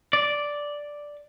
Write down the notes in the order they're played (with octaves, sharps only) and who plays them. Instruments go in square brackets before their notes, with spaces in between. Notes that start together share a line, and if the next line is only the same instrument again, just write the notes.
[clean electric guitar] D5